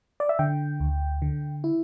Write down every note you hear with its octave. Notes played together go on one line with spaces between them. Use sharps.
D5
E5
D3 G5
D2
D3
E4